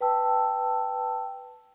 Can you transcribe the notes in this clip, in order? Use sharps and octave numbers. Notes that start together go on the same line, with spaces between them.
B4 G5 A5 E6